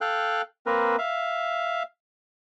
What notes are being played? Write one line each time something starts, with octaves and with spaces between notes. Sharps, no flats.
A4 F5 G5 F#6
A#3 C4 A#4 B4
E5 F5